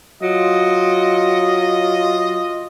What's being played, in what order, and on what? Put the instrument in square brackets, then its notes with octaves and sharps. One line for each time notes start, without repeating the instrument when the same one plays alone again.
[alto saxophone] F#3 [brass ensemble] F4 D#5